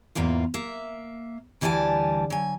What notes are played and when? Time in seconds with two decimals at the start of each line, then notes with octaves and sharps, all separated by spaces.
0.15 E2 G#2 A#3 F4
0.54 A#3 E5
1.61 D2 E3 G3 D5 G#5 A5
2.30 F#3 G#5